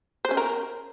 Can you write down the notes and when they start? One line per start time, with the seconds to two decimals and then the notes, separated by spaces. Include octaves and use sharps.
0.25 C5
0.31 C#4
0.37 A#4